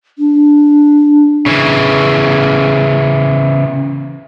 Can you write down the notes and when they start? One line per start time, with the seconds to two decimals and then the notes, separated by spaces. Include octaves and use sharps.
0.19 D4
1.46 C#3 E3